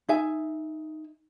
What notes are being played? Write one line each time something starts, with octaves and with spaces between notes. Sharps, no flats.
D#4 E5 G#5